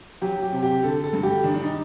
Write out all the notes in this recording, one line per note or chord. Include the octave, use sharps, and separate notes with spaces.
F#3 G4
G4
C3
G4
D3 A4
A4
G2
G4
D#3 D4
D4
D#4